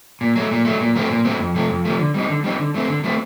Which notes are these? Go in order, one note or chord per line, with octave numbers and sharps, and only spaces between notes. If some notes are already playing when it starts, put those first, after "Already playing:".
A#2
F#3 A3
A#2
F#3 A3
A#2
F#3 A3 C4
A#2
F#3 A3 C4
F2
C3 F3 A3
F2
C3 F3 A3
D3
G3 C4 D#4
D3
G3 C4 D#4
D3
F#3 A3 C4
D3
F#3 A3 C4